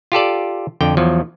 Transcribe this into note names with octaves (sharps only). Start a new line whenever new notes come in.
F4 G4 A4 D5
F2 D3 G5
E2 F3 F#3